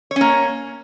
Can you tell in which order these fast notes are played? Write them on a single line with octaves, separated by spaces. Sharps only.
C#5 C#4 A#3